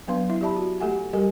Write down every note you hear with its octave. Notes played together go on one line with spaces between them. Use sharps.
F#3 B3 D4 B4 F5 C6
E4 E5
G4 D5 E5 A5 B5
F#4
A3 G4 A4 E5 F#5 G#5
G3 G4 A4 A#4 G#5